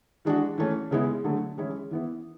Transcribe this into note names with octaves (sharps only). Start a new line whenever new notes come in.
E3 G#3 D4 F#4
E3 A3 C#4
C#3 G#3 B3 E4
D3 F#3 A3
E3 G#3 C#4 E4
E3 B3 E4